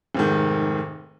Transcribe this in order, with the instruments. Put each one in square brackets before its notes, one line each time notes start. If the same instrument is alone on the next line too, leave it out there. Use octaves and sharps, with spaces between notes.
[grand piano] F1 G#2 D#3